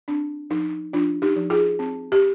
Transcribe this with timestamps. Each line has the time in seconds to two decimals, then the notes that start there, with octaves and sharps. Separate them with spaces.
0.08 C4 D4
0.50 F3 D#4
0.93 F3 D4 F4
1.22 D#4 G4
1.36 F3
1.50 F4 G#4
1.79 C4
2.12 G4